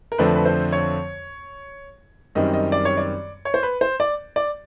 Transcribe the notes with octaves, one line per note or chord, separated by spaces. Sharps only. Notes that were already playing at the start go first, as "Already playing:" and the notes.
A#4
F2 D3 F3 A3 C4 B4
B4
C5
C#5
F#2 D#3 G3 C4 D#5
D#5
D5
C#5
D5
C#5
C5
B4
C5
D5
D5